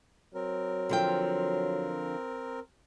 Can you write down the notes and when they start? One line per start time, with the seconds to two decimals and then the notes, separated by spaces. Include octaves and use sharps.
0.34 F#3 C4 A#4
0.89 D3 F3 G5